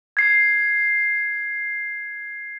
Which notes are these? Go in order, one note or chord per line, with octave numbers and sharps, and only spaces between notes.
G#6 C7